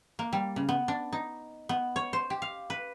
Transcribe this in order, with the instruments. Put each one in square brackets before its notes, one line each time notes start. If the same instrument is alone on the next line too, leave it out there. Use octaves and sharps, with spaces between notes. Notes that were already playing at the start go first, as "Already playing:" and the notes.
[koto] A#3
G3
C#3
B3
D4
D#4
B3
C#5
C5
G4
F5
B4